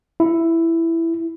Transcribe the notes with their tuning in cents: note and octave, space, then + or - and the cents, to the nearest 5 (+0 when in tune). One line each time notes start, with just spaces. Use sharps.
E4 +5